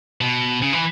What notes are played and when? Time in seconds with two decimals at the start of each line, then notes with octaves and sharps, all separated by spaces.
0.21 B2
0.62 C#3
0.73 E3